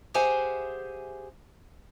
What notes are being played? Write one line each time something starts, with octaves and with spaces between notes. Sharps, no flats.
G4 G#4 C5 E5 F#5 G#5